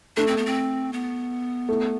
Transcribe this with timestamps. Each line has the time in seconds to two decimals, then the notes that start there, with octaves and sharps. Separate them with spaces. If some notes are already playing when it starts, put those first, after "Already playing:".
0.17 A3 D4
0.27 C4
0.37 B3
0.46 C4
0.93 B3
1.69 A3